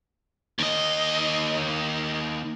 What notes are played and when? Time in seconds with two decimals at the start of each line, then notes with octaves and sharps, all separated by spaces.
0.59 D#2 D#5